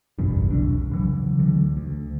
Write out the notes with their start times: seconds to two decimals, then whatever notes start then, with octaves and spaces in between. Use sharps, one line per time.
0.19 F#1 B1 E2 G2
0.50 E1 C2 D4
0.92 C#3 E3 F#3
1.39 D2 D3
1.77 D2